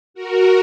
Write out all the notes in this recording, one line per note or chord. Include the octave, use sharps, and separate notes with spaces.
F#4 A#4